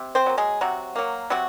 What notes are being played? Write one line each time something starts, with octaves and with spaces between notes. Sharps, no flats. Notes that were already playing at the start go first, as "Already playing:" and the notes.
Already playing: C3
C4 C5
F#3 A#3
G#3 G#4
C3 F#3 F#4
F#3 A#3
C3 F#3 F#4